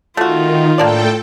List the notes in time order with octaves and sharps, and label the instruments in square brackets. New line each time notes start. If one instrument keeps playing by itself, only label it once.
[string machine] D#3 [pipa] A3 F#4 [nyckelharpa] F4
[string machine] A2 A4 G5 [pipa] A#3 D4 D5